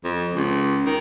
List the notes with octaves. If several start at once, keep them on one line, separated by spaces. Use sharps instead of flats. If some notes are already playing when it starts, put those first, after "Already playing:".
F2
C#2
D#3